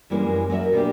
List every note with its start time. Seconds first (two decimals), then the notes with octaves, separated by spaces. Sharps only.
0.10 F#2 E3 G3 G#3 A#3 C#4
0.50 F#3 A#4 C#5 E5
0.73 B2 A#3 D4 G4